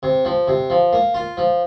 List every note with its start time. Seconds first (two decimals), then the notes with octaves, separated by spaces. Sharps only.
0.03 C3
0.25 F3
0.48 C3
0.70 F3
0.93 A#3
1.14 F4
1.37 F3